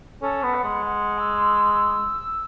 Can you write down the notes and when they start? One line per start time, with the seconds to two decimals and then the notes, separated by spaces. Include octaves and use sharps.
0.21 C#4 A4
0.43 B3
0.54 F#5
0.64 G#3
0.85 F#5
1.19 E6